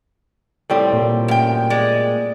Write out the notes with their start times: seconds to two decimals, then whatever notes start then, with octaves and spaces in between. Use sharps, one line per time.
0.70 A2 G3 C4
0.93 A#2 A#3
1.28 F#2 G5
1.70 G#3 D5